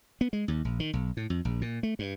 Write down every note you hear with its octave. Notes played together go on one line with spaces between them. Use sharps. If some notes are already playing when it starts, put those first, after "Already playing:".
B3
G#3
D#2
A#1
D#3
B1
A2
F2
A#1
A#2
A3
G2